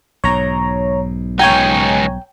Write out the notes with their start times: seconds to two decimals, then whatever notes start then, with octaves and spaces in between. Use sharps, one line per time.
0.24 B1 G#2 C#5 A#5
1.39 C#2 D#4 C#5 G5 G#5 A#5